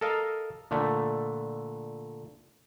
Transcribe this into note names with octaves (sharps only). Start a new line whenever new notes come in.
A4 A#4 D#5 F5
A#2 D3 A3